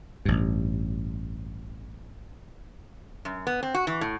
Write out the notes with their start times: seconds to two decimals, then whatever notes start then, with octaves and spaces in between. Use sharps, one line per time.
0.25 A1 G2
3.25 F#2
3.47 B3
3.63 C4
3.74 F#4
3.87 E3
4.01 A2